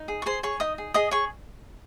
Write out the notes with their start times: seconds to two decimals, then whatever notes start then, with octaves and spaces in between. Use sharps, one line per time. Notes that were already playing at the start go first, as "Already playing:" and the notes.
Already playing: D#4
0.08 G#4
0.22 C#6
0.26 G#4 C5 C6
0.43 G#4 C#5 C#6
0.60 D#4 D#5 D#6
0.78 G#4
0.94 G#4 D#5 D#6
1.11 G#4 C#5 C#6